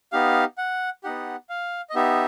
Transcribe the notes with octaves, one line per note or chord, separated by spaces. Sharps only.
B3 D#4 G4 F5
F#5
B3 D#4 G4 F#5
F5
D#5
B3 D#4 G4 E5